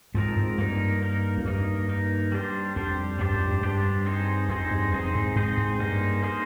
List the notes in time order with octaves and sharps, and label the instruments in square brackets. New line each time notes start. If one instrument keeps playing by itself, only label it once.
[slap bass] G#2 [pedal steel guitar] F3 C4 D#4 A#4
[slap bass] G#2
[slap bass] G2 [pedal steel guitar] A#3 D#4 A#4
[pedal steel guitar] A#3 D#4 A#4
[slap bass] F2
[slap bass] G2 [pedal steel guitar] A#3 D#4 A#4
[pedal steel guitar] A#3 D#4 A#4
G3 D4 G4 C5
[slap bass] F2 [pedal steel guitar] G3 D4 G4 C5
[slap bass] G2 [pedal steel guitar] G3 D4 G4 C5
[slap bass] F2
G2
[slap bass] G2 [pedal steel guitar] G3 D4 G4 C5
[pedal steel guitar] C4 D#4 G#4 C5
[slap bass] F2 [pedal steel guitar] C4 D#4 G#4 C5
[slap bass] G2
[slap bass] F2 [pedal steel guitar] C4 D#4 G#4 C5
[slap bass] G#2
[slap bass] G#2 [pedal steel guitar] C4 D#4 G#4 C5
[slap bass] G#2
[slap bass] G2 [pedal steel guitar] A#3 D#4 G#4 C5
[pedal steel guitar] A#3 D#4 G#4 C5